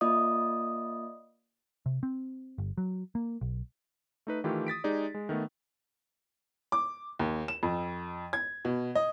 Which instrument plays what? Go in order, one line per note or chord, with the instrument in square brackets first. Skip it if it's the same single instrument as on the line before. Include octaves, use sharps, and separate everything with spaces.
[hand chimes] A#3 F4 D5 D#5 D#6
[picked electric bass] C3
C4
G1
F#3
A#3
B1
[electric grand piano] A3 D#4 B4
D#3 E3 A3 E4 F4 G4
D#6 A6 B6 D7
G#3 D#4 G4 G#4 D5
G#3
D#3 A3 B3
[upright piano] D6
D#2
E7
F2
G#6
B2
D#5